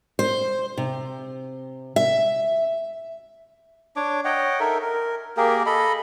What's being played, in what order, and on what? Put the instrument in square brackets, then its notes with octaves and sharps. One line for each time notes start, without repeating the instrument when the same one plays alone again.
[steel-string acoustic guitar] C5
C3
E5
[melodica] D4 C#5 D6
C#5 D#5 F#5 G5
D#4 A4 A#4 E5
A#4
A#3 G4 G#4 A#4
A4 D#5 B5